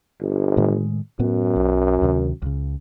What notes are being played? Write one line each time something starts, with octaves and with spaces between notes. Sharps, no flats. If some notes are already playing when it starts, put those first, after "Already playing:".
G1
A2 D#3 G#3
F#2 A2 B3
B1
D2 C3 D#3
C#2 C#3